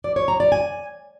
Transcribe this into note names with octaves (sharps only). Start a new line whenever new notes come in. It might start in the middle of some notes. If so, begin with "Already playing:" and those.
D5
C#5
A#5
D5
G#5